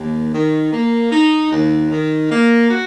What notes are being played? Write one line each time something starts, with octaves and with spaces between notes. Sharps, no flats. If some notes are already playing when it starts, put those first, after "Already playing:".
Already playing: D#2
D#3
A#3
D#4
D#2
D#3
A#3
F#4